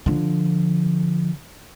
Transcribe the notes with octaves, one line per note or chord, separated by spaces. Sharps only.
D3 F3